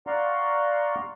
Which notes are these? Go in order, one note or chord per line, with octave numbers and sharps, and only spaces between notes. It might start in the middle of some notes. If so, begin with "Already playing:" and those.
D5 F5 F#5 A#5 C6 C#6